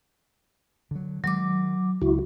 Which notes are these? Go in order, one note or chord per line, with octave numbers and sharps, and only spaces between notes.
D3 F#3
D#3 F3 F#3 G#3 D6
C#2 E4 F#4